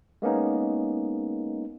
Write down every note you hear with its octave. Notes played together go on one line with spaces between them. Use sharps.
G#3 A#3 B3 C#4 D#4